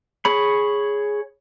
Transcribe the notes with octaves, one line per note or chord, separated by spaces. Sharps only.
G#4 C#5 B5